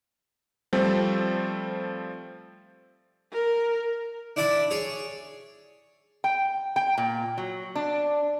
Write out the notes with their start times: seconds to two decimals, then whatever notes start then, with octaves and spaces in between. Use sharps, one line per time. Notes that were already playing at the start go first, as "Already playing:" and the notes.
0.73 F3 G3 A3 C4
3.32 A#4
4.36 D4 E4 D5 A5 B5
4.71 G#4 C#5
6.24 G5
6.76 G5
6.98 A#2
7.38 F#3
7.75 D4